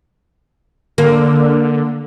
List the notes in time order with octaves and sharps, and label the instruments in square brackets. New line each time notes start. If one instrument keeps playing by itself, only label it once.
[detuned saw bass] D3 [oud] A#3